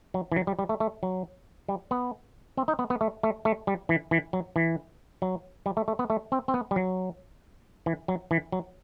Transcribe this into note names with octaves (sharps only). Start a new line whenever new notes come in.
F#3
E3
F#3
G3
G3
A3
A3
F#3
G3
B3
C4
D#4
B3
B3
A3
A3
A3
G3
E3
E3
F#3
E3
F#3
G3
A3
A3
B3
A3
C4
C4
B3
G3
F#3
E3
F#3
E3
F#3